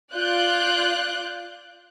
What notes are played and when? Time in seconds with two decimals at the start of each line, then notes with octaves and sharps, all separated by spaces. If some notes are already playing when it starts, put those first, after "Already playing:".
0.14 F4 D5 F#6 G6